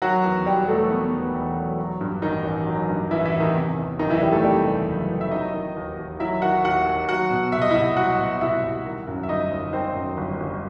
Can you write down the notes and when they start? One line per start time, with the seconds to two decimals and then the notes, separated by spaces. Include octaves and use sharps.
0.02 D#3 F#3 F#4
0.24 E2
0.46 E1 G3 G4
0.68 F#3 A3 A4
0.90 D#3 B3
1.13 E2
1.34 E1
1.56 F#3
1.79 F#3
2.01 G2
2.22 A1 D#3 D#4
2.45 A1
2.66 F#3
2.89 G2
3.11 A1 E3 E4
3.25 E3 E4
3.33 A1
3.40 D#3 D#4
3.55 C3
3.78 E2
3.99 F#1 D#3 D#4
4.10 E3 E4
4.21 E3 G3 G4
4.32 A3 A4
4.43 C3 G3 G4
4.66 E2
4.88 F#1
5.10 E3
5.21 E5
5.31 F#3 D#4 D#5
5.54 D#3
5.76 D#2
5.98 D#2
6.20 F#3 E4 E5
6.42 D#3 F#4 F#5
6.64 D#2 F#4 F#5
6.86 D#2
7.09 F#3 F#4 F#5
7.30 B2
7.52 C2 E5
7.62 D#5
7.71 E4 E5
7.75 C2
7.96 F#3 F#4 F#5
8.18 B2
8.41 C2 E4 E5
8.63 C2
8.86 D#3
9.07 F#2
9.23 E5
9.29 G1 D#4 D#5
9.51 G1
9.73 D#3 C4 C5
9.95 F#2
10.17 G1
10.40 G1